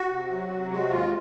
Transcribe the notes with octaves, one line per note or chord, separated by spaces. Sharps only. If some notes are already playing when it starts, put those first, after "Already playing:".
Already playing: F#4
C3
F#3
C3
G#3 F#4
D#2 F4